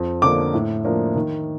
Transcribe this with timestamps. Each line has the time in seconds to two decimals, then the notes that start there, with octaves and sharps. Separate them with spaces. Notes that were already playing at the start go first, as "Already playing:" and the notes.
Already playing: F2
0.22 D3 F3 A#3 D4 D6
0.54 A2
0.85 F3 A#3 D4
1.16 D#3